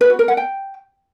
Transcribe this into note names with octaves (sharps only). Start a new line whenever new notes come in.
B4
F#4
A#4
F#5
G5